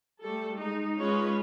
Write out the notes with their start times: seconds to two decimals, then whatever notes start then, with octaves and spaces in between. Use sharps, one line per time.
0.21 G3 A3 A4
0.56 G#3 D#4
0.95 G#3 C#4 F4 B4 C#5 D#5